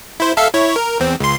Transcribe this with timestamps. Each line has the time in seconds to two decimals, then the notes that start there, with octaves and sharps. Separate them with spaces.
0.20 E4 C5
0.37 A4 E5 F5
0.54 E4 C#5
0.76 A#4
1.00 E2 C4
1.20 C#2 C6